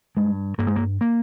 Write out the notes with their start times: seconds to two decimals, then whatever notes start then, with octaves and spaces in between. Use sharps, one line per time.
0.17 G2 G#3
0.58 G2 A#3
0.67 G#3
0.76 A#3
1.01 A#3